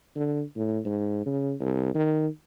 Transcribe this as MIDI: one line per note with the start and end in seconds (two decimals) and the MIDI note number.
0.16 0.43 50
0.56 0.79 45
0.85 1.21 44
1.26 1.54 49
1.60 1.92 36
1.95 2.28 51